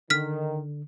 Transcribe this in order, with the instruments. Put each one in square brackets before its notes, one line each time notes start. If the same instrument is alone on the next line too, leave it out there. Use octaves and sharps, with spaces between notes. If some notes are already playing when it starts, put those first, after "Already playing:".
[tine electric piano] D3 [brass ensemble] D#3 [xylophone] F6 B6